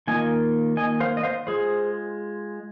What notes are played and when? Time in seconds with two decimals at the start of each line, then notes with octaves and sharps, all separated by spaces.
0.08 D#3 A#3 F4 D#5 G#5
0.77 D#5 G#5
1.00 C5 F5
1.17 D#5
1.23 C5 F5
1.47 G#3 F4 G#4 C5